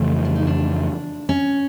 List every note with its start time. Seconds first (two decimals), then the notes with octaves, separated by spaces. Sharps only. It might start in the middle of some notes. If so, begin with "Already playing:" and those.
Already playing: F2 C#3 E3 A3
0.25 D4
0.36 D#4
0.47 D4
1.29 C#4